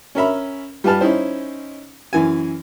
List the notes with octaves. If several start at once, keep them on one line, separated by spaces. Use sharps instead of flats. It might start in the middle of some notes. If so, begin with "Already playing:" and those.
C#4 A#4 E5 B5
G3 F4 B4 A5 F6
C#4 D#4 E4 C5
F#2 E3 G#5